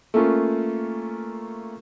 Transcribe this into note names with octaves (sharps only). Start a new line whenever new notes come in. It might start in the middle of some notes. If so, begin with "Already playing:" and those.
A3 A#3 C#4 F4